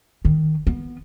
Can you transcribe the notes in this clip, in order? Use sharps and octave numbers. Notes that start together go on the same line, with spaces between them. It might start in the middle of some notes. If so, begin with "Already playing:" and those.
D#3
B3